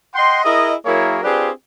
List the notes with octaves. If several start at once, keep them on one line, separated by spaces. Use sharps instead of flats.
D#5 F#5 G5 C6
E4 G#4 A#4 D#5
F#3 A#3 E4 G#4 A#4 C#5
C4 D4 F4 G4 G#4 B4